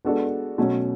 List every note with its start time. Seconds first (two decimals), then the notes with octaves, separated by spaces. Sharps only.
0.05 G#3 B3 D4 F#4 A4
0.58 B2 F#3 A3 C#4